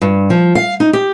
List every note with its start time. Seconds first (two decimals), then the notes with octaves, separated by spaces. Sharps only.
0.02 G2
0.30 F3
0.55 F5
0.80 D#4
0.93 G4